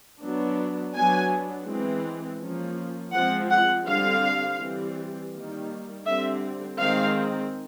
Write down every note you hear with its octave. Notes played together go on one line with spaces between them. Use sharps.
F#3 B3 D4
F#3 B3 D4 G#5
E3 G#3 C4
F3 A#3 C#4
F3 G#3 C4 F#5
F#5
D3 G3 C4 F5
E3 G3 C4
D#3 G3 A#3
D3 G3 C4 E5
D#3 G#3 C4 F5